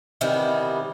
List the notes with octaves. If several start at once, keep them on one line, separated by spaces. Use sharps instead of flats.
C3 D#3 E3 G3 B3